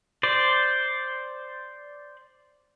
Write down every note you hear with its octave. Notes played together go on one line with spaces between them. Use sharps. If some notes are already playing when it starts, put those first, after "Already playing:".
C5 D5